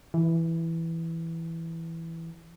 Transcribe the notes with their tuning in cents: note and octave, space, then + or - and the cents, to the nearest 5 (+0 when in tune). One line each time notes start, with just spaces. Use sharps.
E3 +0